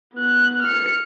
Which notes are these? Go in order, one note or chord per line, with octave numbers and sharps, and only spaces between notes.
B3 F#6
F6 C#7